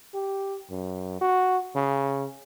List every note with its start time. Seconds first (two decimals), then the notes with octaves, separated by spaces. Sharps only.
0.15 G4
0.70 F#2
1.21 F#4
1.76 C#3